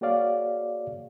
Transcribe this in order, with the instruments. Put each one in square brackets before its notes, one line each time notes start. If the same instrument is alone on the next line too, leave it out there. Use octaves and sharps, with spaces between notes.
[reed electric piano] A#3 F#4 G#4 C#5 D5 F5